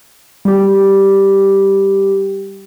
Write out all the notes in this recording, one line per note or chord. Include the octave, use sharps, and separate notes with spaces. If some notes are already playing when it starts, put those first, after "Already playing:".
G3 G4